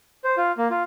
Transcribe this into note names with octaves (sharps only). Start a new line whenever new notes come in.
C5
F4
A#3
F4